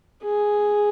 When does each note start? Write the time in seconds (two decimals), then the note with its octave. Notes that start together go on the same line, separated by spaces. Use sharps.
0.24 G#4